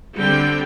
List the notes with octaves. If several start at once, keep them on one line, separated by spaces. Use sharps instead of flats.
D3 G3 C4 G5